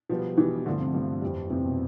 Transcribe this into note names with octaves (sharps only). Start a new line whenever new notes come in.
B2 F3 G3 B3
B2 E3 G3 B3
G2 D3 F3 A3
C3
G2 F3 A3
F2 E3 G3
F2 C3 E3 G3
B2